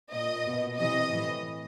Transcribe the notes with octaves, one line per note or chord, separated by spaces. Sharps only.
A#2 D#5
B2
C3 E3 D#5
A2 E3